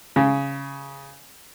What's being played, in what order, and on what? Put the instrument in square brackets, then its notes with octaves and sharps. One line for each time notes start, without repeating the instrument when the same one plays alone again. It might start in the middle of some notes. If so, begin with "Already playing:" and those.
[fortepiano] C#3